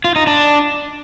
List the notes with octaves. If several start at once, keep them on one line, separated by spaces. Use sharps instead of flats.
F4
D#4
D4